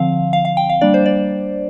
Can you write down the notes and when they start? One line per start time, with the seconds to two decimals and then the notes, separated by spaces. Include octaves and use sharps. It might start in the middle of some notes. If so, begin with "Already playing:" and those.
Already playing: D3 F3 C4 F5
0.33 F5
0.45 F5
0.57 G5
0.69 F5
0.81 G3 A#3 D4 D5
0.94 C5
1.06 D5